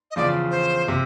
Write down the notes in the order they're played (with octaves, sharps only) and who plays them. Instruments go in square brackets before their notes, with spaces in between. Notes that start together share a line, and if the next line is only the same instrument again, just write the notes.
[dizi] D#5
[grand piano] E2 C#3 F3 [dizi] D5
[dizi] C5
[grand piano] C3